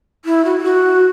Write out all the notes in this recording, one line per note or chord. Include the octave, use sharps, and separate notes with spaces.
E4
F#4
G4
F#4